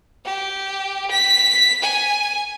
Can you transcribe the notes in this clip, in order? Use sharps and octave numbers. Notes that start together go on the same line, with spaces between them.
G4
B6
G#5